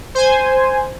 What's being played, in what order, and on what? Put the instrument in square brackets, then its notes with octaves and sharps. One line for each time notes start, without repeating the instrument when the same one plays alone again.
[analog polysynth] C5 G#5